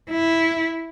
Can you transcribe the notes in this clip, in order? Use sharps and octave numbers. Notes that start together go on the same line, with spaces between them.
E4